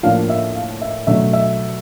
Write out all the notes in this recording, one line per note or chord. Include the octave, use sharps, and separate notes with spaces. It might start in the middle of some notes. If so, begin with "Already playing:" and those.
A2 F3 A#3 D4 F5
E5
F5
E5
B2 F#3 A3 D4 E5
E5